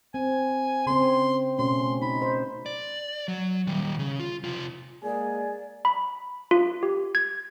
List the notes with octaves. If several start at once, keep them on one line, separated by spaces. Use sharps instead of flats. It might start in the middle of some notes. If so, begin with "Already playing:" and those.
C4 G#5
C#3 C4 C6
B2 A3 C#4 C6
D#4 B5
C5
D5
F#3
D#3 G3
C#3
F4
C3 F4
G#3 A#3 G#4 D5 G#5
B5
F4
G4
G#6